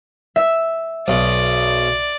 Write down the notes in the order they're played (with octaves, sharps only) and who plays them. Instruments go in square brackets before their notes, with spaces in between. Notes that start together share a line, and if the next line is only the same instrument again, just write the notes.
[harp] E5
[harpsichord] B1 [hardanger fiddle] D5